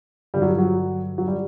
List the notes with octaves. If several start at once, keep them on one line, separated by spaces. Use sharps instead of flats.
G2 D3 F3 G3
F#3
F3
F#3
F#3
G3